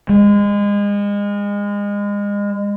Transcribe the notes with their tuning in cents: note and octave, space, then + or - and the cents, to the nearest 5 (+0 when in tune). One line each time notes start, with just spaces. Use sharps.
G#3 -30